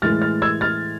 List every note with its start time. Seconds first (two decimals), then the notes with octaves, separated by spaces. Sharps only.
0.02 A2 E3 G#3 F6 A6
0.21 F6 A6
0.42 E6 G#6
0.61 F6 A6